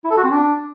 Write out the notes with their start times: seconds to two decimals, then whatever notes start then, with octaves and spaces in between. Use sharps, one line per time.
0.04 E4
0.11 A4
0.17 F#4
0.24 C4
0.31 D4